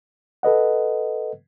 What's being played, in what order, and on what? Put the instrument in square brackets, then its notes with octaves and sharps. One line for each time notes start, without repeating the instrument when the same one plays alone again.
[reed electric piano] A4 B4 D#5 F#5